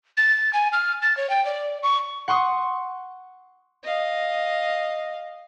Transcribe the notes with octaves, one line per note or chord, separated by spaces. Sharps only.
A6
G#5
F6
A6
C#5
G5
D5
C#6
F#5 C6 C#6 D#6
D#5 F5